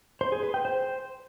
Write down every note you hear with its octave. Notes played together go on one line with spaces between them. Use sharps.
C5
G#4
B4
G5
C5